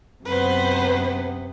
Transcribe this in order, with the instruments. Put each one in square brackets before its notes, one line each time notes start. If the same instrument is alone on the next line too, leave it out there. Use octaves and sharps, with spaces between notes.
[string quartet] F#2 C3 B3 [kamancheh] B4 C5